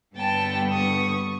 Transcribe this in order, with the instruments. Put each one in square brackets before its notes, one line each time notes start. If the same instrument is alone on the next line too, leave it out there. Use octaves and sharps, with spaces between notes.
[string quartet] G2 D3 G3 B3 G5 A5
C#6 D#6